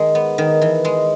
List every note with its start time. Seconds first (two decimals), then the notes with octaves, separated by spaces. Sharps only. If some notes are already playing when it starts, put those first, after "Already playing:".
Already playing: D#3 G#3
0.15 B3
0.38 D#3
0.61 E3
0.85 G#3